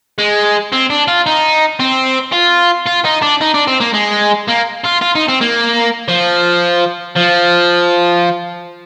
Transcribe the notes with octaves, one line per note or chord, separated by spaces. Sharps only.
G#3
C4
D4
F4
D#4
C4
F4
F4
D#4
D4
D#4
D4
C4
A#3
G#3
A#3
F4
F4
D#4
C4
A#3
F3
F3